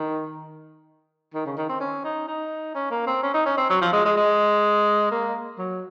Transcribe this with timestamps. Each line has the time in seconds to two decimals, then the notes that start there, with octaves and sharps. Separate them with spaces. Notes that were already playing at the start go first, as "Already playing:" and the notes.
Already playing: D#3
1.34 D#3
1.46 C#3
1.57 D#3
1.69 C4
1.80 C#4
2.04 D#4
2.28 D#4
2.75 C#4
2.91 A#3
3.07 C4
3.23 C#4
3.34 D#4
3.46 C#4
3.58 C4
3.70 F#3
3.82 F3
3.93 G#3
4.05 G#3
4.17 G#3
5.11 A#3
5.58 F#3